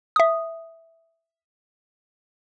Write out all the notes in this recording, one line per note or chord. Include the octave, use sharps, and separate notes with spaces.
E5 D#6